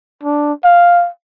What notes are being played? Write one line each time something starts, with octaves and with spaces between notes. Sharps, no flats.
D4
F5